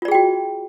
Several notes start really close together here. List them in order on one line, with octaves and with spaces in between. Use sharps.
F4 D5 G#4 G5 F#4